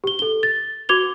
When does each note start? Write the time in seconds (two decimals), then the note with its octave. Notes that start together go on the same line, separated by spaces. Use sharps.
0.04 G4 G7
0.19 A4 G7
0.43 A6
0.89 F#4 D6 G#6 F7 G7